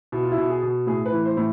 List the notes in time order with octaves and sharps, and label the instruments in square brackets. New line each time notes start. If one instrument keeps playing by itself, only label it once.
[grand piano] B2 E4
F4
E4
B2
G#4
B2
A2 G#4
B4
E3
C5
A2